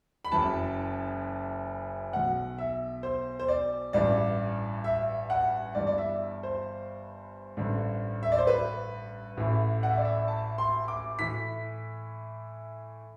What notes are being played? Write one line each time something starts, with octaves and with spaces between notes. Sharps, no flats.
B5
F#1 F#2 E3 A5
B1 B2 F#5
E5
C5
C5
D5
A1 G2 E3 D5
E5
F#5
G1 G2 E3 D5
D5
E5
C5
A1 G2 D3
E5
D5
C5
B4
A1 A2 E3
F#5
E5
D5
E5
A5
C6
D6
A2 E3 B6